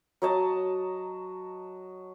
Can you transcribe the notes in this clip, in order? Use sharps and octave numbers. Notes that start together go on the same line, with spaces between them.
F#3 D#5 A5